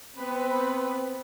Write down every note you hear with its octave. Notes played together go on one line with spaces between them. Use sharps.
B3 C4 B4 B5